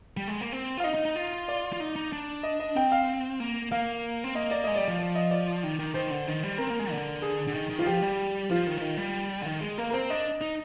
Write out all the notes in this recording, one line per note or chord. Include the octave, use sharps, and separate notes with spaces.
G3
G#3
A#3
C4
F4
F5
D#4 D#5
D#4
D#4
F4
D5
F4
D#4
D#4
D4
D#5
D#5
C4 G5
F5
A#3
A#3 F5
C4
A#3 D#5
D5
G#3 D#5
G3 D5
F3
D5
D#5
D5
D#3
D#3
D#3 C5
D3
D#3
G3
C4 A#4
A#3
G#3
D3
G#4
D3
D#3
D#3
F4
D#3
F3 G4
G3
F3 F4
D#3
F3
D#3
G3
D3
D#3
G#3
A#3 A#4
A#4
C4 C5
D4 D#5
D#4